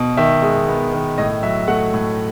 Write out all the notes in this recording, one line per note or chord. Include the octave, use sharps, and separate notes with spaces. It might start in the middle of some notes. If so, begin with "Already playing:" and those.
Already playing: B2
D#3 E5
G#3
B3
D#3
A2 D#5
F#3 E5
A3 F#5
A2